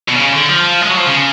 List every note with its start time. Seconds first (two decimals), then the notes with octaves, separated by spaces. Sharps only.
0.09 B2
0.17 C#3
0.32 D3
0.49 F3
0.82 G#3
0.90 F#3
0.97 F3
1.07 C#3